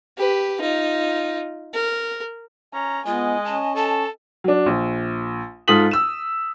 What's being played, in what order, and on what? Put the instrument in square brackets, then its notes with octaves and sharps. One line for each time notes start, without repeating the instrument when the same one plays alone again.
[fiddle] G4 B4
D#4 F4
A#4
[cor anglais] C#4 [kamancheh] A#5
[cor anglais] G#3 [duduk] B3 [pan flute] F4 [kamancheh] D#5 G#5
[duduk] C#4 [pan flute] A5
[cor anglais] A4 [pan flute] A5
[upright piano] F#3 D4
A#1
G#2 F4 A4 D#6 B6 F#7
E6 E7